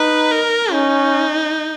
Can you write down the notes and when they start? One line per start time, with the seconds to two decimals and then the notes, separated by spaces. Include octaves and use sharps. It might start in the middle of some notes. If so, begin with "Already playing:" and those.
Already playing: D#4 B4
0.32 A#4
0.72 C#4 D#4